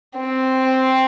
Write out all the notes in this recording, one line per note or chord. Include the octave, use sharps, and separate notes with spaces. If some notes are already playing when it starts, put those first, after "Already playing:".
C4